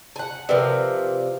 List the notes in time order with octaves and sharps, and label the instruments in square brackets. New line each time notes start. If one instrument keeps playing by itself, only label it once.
[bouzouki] F#5 G#5
[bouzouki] C3 F3 [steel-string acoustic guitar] A#4 B4 D5